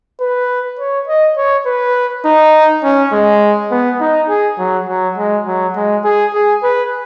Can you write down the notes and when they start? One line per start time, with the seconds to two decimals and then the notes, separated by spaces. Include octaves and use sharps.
0.20 B4
0.79 C#5
1.08 D#5
1.37 C#5
1.66 B4
2.25 D#4
2.84 C#4
3.13 G#3
3.72 B3
4.01 D#4
4.29 G#4
4.59 F#3
4.88 F#3
5.18 G#3
5.47 F#3
5.76 G#3
6.05 G#4
6.34 G#4
6.63 B4